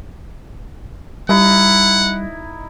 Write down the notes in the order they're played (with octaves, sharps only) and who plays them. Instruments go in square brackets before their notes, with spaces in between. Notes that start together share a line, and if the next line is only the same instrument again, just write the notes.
[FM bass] G3 [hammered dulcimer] D#4 E4 [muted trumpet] F#5